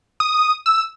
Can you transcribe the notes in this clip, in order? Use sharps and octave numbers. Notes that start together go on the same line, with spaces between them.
D#6
E6